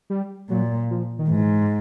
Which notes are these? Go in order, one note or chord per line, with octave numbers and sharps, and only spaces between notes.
G3
A#2 F#3
F3
D#3
G#2 E3